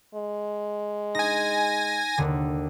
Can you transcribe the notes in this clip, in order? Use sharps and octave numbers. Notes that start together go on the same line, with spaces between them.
G#3
D#4 G#5 A#6
D#2 D3